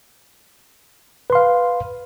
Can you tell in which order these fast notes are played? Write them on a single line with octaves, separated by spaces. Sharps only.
B4 C6 F5